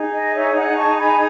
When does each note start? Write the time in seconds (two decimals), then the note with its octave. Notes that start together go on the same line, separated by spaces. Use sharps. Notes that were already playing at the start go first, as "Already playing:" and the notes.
Already playing: D#4 G#4
0.13 D#5
0.33 C#5 E5
0.55 D#5 F#5
0.77 A5 C#6
0.98 G#5 B5